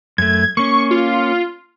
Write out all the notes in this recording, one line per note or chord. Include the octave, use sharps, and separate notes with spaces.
F#2 A3 G#6
A#3 C#4 C#6
F4